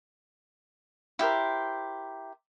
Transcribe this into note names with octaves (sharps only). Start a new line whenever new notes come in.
E4 G4 A#4 C5